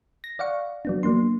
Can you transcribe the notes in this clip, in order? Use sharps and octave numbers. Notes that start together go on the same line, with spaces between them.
A#6
D5 F5 F#5 C#6
F#3 B3 D4
F#3 A#3 D4 C6